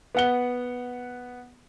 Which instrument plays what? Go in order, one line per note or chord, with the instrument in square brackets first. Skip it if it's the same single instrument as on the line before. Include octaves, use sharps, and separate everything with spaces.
[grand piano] B3 F#5 G7